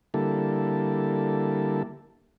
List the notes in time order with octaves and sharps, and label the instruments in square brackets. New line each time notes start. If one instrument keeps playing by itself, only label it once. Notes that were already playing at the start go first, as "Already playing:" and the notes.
[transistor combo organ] D3 G3 A#3 E4 A4